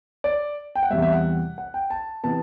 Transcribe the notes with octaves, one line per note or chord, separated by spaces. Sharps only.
D5
G5
F#5
E2 C3 G3 E5
E5
F#5
F#5
G5
A5
C3 E3 B3 A5